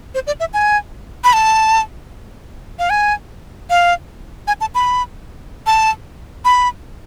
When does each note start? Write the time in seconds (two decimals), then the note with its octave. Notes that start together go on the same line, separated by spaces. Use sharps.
0.15 C5
0.27 D5
0.40 E5
0.54 G#5
1.24 B5
1.33 A5
2.79 F5
2.90 G#5
3.70 F5
4.48 G#5
4.61 A5
4.75 B5
5.66 A5
6.45 B5